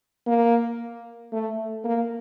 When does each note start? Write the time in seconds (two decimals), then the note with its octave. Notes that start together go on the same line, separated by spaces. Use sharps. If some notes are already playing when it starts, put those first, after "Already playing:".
0.27 A#3
1.33 A3
1.84 A#3